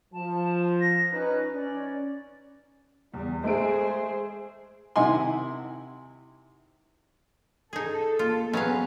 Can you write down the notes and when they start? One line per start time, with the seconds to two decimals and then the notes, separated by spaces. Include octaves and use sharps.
0.13 F3 A5
0.81 A#6
1.12 C#4 D#4 B4 F#6
1.54 C#4 D5
3.14 E2 G3
3.44 G#3 A3 G#4 C5 D7
4.96 C3 D#3 E4 F#5 G#5 C6
7.73 D#4 G#4 A4
8.19 A#3 F4
8.53 F#3 G#3 B3 C#4 B4 F5